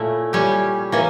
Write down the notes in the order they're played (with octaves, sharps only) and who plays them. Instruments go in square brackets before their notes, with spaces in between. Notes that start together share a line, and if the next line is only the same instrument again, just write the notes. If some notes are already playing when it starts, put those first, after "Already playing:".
Already playing: [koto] A#2 A3 C#4 E4
G3 C#4 G4
E3 A#3 C#4